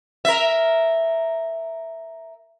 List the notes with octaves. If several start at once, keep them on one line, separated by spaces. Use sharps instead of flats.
A#4 E5